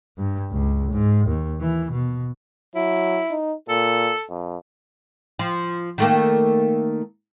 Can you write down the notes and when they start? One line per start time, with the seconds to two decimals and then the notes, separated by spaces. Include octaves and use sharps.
0.18 G2
0.51 C#2
0.92 G#2
1.27 D#2
1.61 E3
1.92 B2
2.75 F#3 E4
3.30 D#4
3.69 A#2 A4
4.29 F2
5.39 F3
5.98 D#3 A3 A#3